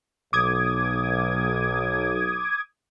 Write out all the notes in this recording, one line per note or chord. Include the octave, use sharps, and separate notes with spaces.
B1 D6 D#6 G#6